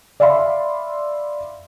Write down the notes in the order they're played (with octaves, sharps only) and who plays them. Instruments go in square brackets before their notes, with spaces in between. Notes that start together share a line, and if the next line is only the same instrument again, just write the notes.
[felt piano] D5 E5 F5 B5 C6